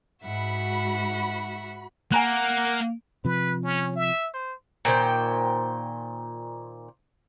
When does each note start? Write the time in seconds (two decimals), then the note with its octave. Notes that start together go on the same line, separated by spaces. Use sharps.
0.23 G#2 F#4 E5 F#5 B5
2.12 A#3 F#5 G#5 A#5 F#6
3.25 C3 F3 B4
3.64 C#4
3.96 E5
4.34 C5
4.85 A#2 D#3 C5 G5